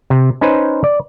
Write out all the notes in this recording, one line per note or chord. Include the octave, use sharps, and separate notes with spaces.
C3
C#4 D#4 B4 C5
D5